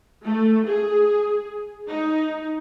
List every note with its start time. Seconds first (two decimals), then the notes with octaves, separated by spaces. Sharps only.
0.24 A3
0.67 G#4
1.88 D#4